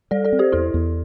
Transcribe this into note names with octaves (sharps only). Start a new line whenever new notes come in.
G3 A4 D5
A4 D5
C4
G4 C5
E2 E4 A4
E2